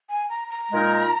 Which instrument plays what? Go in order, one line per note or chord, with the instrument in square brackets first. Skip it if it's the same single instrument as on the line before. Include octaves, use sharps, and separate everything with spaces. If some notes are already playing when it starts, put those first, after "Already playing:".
[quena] G#5
A#5
A#5
[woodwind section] A#2 G#3 D#4 A#4